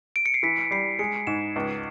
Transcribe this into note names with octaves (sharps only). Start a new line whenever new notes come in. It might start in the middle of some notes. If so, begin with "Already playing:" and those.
D7
C#7
C7
E3 B6
G3 C7
G#3 C#7
G#2 E7
C#2